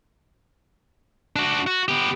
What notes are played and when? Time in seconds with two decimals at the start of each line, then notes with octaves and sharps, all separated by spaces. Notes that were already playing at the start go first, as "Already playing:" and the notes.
1.36 D4 F#4
1.67 F#4
1.88 B3 G4